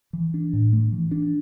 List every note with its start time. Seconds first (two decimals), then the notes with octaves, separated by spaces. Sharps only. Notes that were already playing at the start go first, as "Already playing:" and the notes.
0.13 E3
0.34 D4
0.53 A2
0.73 A3
0.92 E3
1.11 D4